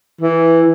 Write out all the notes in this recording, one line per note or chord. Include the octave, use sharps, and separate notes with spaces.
E3